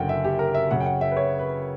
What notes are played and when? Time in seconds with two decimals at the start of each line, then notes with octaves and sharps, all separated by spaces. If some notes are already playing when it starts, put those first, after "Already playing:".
Already playing: F#1 F#2 D3 F#5 G5
0.09 E5
0.24 G4
0.39 A#4
0.54 E5
0.71 F#2 C#3 F#3 C#4 F#5
0.80 G5
0.86 F#5
1.01 E5
1.11 B4
1.17 C#5
1.39 B4